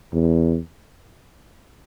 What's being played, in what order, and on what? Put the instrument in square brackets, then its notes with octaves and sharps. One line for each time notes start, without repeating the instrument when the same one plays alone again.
[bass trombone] E2